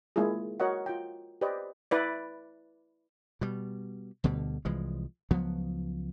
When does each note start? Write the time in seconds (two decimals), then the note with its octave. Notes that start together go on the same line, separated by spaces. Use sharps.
0.16 G#3 A#3 E4 F4 G#4
0.60 F#4 A#4 C#5 D#5 F#5
0.86 F4 G5
1.41 G4 B4 C5 D5 D#5
1.91 E4 B4 D5
3.41 B2 G3
4.24 D2 B2 D3 G3
4.65 C2 E3 F3 G#3
5.31 C#2 F3 F#3 B3